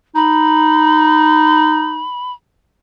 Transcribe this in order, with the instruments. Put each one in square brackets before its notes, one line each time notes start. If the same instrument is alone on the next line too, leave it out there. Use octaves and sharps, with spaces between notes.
[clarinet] D#4 [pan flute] B5